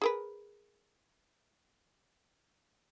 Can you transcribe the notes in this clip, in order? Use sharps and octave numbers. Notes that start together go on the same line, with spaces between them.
G#4 A#4 B4